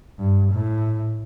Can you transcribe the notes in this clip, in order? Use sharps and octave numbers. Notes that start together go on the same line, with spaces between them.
G2
A2